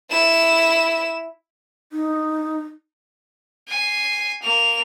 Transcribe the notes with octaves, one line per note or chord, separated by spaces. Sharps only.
E4 E7
D#4
G#5 C7
A#3 F7